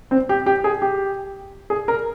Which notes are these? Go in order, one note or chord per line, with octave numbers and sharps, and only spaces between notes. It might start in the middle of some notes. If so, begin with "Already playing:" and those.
C4
G4
G4
G#4
G4
G#4
A#4